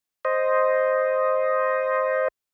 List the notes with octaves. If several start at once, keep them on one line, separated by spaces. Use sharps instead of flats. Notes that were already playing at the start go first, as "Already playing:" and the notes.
C5 D#5